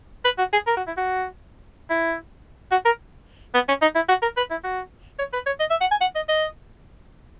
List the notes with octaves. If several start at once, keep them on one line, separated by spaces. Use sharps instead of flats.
B4
F#4
G#4
A#4
F#4
E4
F#4
E4
F#4
A#4
B3
C#4
D#4
E4
F#4
A#4
B4
E4
F#4
C#5
B4
C#5
D#5
E5
F#5
G#5
F#5
D#5
D#5